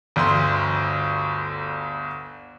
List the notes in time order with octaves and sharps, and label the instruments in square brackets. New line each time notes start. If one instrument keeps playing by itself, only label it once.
[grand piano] G1 D2 C6